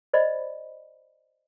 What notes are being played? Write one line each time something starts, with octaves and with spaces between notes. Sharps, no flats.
C5 D5 D#5 B5